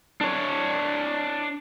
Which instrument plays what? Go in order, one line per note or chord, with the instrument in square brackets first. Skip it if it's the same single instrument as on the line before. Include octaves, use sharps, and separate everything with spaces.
[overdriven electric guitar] D4 C#5